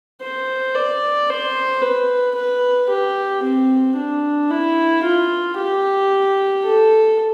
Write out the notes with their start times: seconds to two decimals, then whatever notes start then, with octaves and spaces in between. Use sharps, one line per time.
0.22 C5
0.75 D5
1.30 C5
1.82 B4
2.35 B4
2.90 G4
3.43 C4
3.97 D4
4.50 E4
5.03 F4
5.57 G4
6.64 A4